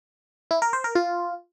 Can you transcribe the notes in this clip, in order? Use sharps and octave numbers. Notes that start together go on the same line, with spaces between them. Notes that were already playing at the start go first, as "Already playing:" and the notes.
E4
A#4
C5
A#4
F4